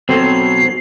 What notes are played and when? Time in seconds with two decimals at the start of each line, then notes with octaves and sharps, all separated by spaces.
0.09 B2 F#3 C4 A4 C5 C7